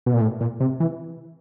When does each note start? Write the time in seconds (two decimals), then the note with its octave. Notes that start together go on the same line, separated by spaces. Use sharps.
0.06 B2
0.14 A#2
0.21 A2
0.41 A#2
0.60 C3
0.80 E3